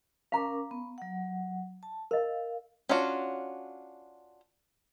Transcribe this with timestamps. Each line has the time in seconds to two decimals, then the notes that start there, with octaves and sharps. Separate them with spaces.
0.32 C#4 A#4 F5 A#5 D6
0.71 B3
0.98 F#3 F#5
1.83 A5
2.11 A#4 D#5 F5
2.89 C#4 D4 F4 F#4